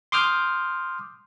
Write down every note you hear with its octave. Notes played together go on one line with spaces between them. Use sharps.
C6 D6 D#6 F6 G6